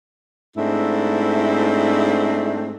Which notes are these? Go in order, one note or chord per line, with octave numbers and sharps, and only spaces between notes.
G#2 A3 C4 D4 E4